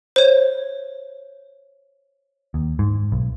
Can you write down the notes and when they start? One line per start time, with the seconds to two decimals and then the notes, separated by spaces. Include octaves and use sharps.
0.16 C5 C#5
2.54 D#2
2.79 G#2
3.12 B1